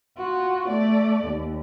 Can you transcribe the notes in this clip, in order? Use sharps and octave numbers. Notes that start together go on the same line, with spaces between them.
F4 F#4
A3 D5
D#2